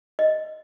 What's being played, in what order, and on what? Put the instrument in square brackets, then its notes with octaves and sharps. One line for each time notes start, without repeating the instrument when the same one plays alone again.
[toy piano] D#5